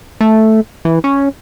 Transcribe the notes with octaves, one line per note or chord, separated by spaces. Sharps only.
A3
E3
C#4